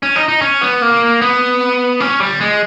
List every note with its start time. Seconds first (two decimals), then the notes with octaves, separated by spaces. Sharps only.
0.03 C#4
0.16 D#4
0.28 D#4
0.42 C#4
0.61 B3
0.82 A#3
1.21 B3
2.00 C#4
2.20 G3
2.41 G#3